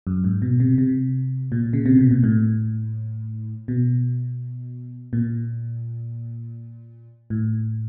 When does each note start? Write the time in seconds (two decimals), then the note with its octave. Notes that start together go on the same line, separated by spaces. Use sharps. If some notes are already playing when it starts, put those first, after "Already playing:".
0.07 F#2
0.24 G#2
0.42 B2
0.60 C3
0.78 C3
1.52 A#2
1.73 C#3
1.86 C3
1.99 B2
2.11 A#2
2.24 A2
3.68 B2
5.13 A#2
7.30 A2